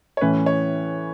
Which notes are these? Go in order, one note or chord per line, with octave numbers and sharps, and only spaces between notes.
C#5
A2 E3 C#4 B4
C#5